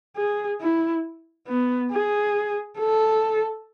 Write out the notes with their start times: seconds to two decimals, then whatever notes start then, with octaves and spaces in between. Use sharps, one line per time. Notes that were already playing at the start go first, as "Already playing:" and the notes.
0.16 G#4
0.61 E4
1.48 B3
1.92 G#4
2.79 A4